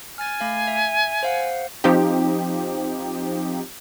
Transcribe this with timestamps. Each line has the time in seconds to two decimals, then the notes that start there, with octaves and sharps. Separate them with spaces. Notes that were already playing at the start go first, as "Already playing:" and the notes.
0.18 G#5 F6 A6
0.41 A3 F5
0.68 E5
1.23 C5 F5 F#5
1.84 F3 C4 D#4 G4